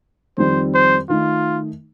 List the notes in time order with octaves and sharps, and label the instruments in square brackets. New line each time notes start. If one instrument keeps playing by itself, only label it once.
[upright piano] F2 D#3 G3 C4 D#4 [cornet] C5
[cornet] C5
[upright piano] D#3 A3 D#4 [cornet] F4